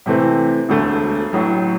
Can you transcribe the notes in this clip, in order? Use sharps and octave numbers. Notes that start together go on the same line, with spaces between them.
C3 E3 A3 C4
E1 D2 D3 A3
A1 A2 F#3